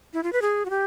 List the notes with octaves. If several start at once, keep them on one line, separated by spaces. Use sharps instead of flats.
E4
F4
B4
G#4
F#4
G4